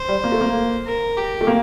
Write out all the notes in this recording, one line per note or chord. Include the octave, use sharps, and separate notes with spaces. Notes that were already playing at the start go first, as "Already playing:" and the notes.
Already playing: C5
G3
A#3
A3
A#3
A#4
G4
A3
A#3